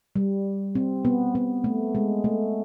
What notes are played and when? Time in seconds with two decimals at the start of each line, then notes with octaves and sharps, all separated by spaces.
0.16 G3
0.75 C4
1.05 B3
1.35 B3
1.64 A3
1.95 G#3
2.24 A3